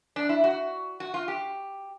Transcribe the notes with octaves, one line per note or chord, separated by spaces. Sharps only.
D4
E4
F#4
F#4
F4
G4